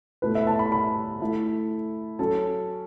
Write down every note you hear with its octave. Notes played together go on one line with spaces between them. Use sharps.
B2 A3 E4 B4
E5
A5
B5
B5
A3 E4 A4
F#3 C#4 A4 A5